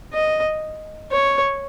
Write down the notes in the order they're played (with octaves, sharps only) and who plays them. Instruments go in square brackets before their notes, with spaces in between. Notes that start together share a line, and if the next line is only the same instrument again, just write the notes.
[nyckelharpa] D#5
C#5